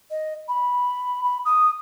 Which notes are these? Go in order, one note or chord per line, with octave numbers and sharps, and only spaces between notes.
D#5
B5
B5
D#6